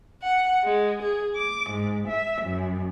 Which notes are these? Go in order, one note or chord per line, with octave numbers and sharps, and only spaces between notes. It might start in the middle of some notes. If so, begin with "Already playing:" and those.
F#5
G#3
G#4
D6
G#2
E5
F#2